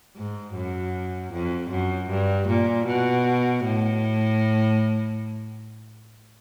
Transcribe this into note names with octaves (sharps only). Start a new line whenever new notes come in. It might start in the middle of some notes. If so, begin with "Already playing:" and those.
G#2
F#2
F2
F#2
G2
A#2
B2
A2